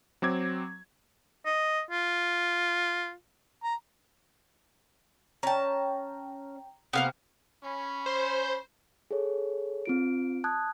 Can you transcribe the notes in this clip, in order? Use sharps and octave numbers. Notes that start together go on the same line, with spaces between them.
F#3 C4 D6 G#6
D#5
F4
A#5
C#4 G5 A5 A#5
C3 A#3 B3 F5
C#4 B5
C5
G#4 A4 C#5
C4 F4 D7
A5 D#6 F#6 G#6